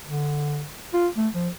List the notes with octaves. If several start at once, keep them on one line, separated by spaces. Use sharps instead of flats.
D3
F4
A3
F3